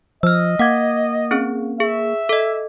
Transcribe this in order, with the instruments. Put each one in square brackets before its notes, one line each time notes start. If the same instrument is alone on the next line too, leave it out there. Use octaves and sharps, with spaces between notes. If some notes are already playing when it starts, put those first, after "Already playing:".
[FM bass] F3 [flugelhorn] D#5 [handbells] E6 F6
[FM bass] A#3 [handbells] F#5 D6 G#6
[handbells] C4 C#4 G#4
[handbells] G#4 [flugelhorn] E5
[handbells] A4 D#5